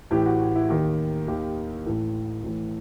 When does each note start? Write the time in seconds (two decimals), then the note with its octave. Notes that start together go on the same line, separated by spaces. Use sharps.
0.11 A1 A2 E3 G4
0.26 F#4
0.55 E4
0.69 D#2 D#3 G4
1.28 D#2 D#3 G4
1.86 A1 A2 E3 A4
2.43 A1 A2 E3